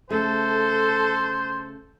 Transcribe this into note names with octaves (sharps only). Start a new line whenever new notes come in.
C#3 A3 A4 C5